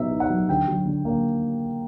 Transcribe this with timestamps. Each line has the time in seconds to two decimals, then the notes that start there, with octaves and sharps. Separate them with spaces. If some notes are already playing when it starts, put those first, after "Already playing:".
Already playing: B2 F#3 B3 D#4 E5
0.11 D#4
0.20 F#5
0.30 F#3
0.49 D3 G5
0.68 F#3
0.86 D3
1.05 A#3